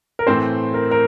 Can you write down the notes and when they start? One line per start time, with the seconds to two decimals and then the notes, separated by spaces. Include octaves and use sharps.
0.19 A#4
0.27 A2 E3 A3 C4 C5
0.74 A#4
0.91 A#4